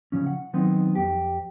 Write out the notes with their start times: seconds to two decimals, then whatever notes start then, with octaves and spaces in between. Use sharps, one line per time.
0.12 C#3 F3 C#4
0.26 F#5
0.53 D#3 F#3 B3 C4 D#4
0.95 F2 G4